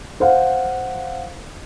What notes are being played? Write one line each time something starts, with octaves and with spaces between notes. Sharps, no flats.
C5 F5 F#5